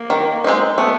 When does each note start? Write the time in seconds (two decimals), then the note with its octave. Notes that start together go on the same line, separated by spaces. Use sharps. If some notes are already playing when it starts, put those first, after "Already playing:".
Already playing: A#3
0.10 D#3
0.44 G#3 C4 D#4
0.78 A3 B3